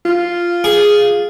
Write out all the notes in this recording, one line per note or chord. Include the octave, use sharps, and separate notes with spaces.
F4
G#4